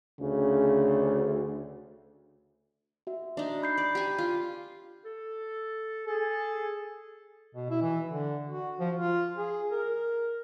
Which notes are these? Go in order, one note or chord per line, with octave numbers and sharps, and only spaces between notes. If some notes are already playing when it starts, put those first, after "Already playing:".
D2 C#3
F#4 E5
D4 D#4
B5 G6 C7
D5
G4 G#5
F4
A4
G#4 A4
B2
E4
E3
D3
F#4
F3
F4
G#4
A#4